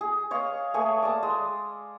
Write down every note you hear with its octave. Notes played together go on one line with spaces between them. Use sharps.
G#4
C#5 D#5 F5
A3 G#4 C#5 G#5
D5 G#5 A5 D#6
G#3